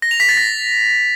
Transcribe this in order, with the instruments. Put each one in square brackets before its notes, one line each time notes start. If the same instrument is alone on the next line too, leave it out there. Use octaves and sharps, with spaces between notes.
[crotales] A#6
F7
B6
A6
A#6